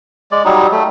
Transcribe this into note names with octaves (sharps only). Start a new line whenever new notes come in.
G#3 D5
F#3 G3 D#4
A3